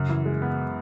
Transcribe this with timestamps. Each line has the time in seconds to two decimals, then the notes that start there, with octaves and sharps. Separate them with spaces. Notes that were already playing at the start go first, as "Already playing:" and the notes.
Already playing: F#2 C#3
0.09 E3
0.25 G#3
0.42 B3